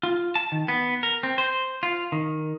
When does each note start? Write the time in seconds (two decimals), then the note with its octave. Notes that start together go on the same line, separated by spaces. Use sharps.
0.03 F4
0.35 A5
0.52 D#3
0.68 B3
1.03 A#4
1.23 C4
1.38 C5
1.83 F4
2.12 D#3